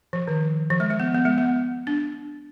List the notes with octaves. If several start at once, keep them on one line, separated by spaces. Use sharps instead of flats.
F3
D#3
F3
G#3
G#3
B3
B3
G#3
B3
D4